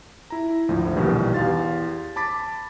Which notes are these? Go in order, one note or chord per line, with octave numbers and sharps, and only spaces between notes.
E4 A#5
G#1 D2 F3 A3
A#1 E2 B2 D#3 G3
E2 G4 F5 C6 A6
A5 B5 D6 A6 B6